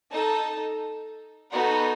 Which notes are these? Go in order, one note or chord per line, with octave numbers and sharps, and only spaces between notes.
D#4 A4 A5
B3 D#4 F#4 A4